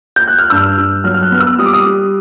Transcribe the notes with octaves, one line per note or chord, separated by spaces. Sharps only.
G6
F#6
F6
G2 E6
G2
F#3 F6
F6
F#6
B3 F6
E6
G3 D#6
D6
D#6
G3